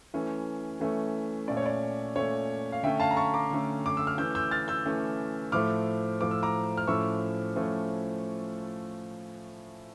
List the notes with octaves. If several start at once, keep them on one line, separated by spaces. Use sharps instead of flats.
E3 A3 C#4
E3 A3 C#4
A#2 A3 C#4 D5
C#5
D5
A#2 A3 C#4 C#5
F5
D3 A3 C#4 E5 G5
F5 A5
A#5
A5 C#6
A#5 D6
D3 A3 C#4
D6
E6
F6
E3 A3 C#4 E6 G6
E6 G6
F6 A6
E6 G6
E3 A3 C#4
A2 F3 A3 D6 F6
A2 F3 A3 D6
E6
A#5 D6
F6
A2 F3 A3 C#4 C#6 E6
A2 F3 A3 C#4